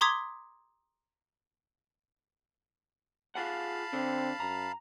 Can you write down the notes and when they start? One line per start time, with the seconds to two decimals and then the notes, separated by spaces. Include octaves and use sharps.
0.01 A#5 C6 D6 D#6 G#6 B6
3.35 F4 G#4 F5 F#5 A5 B5
3.93 D3 C4
4.40 F#2 A#5